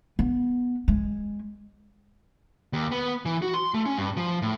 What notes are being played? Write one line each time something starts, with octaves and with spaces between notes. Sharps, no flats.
B3
G#3
D#2
B3
E3
F#4
C6
A3
C#4
G2
F3
A2